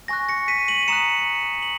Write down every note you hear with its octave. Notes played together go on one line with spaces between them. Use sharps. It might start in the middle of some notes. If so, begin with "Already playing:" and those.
G#5 C#6 F#6 A#6
A#6 C#7
B6 D#7
D#7 F#7
F#7
A#5 D#6 F#6 C#7 E7
F#7